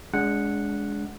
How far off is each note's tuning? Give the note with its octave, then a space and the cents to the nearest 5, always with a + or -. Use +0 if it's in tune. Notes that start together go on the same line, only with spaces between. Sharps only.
G#3 +0 D4 -30 F#5 -5